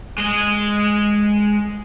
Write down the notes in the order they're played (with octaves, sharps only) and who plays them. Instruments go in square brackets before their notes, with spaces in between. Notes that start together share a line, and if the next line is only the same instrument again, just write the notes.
[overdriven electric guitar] G#3 D#5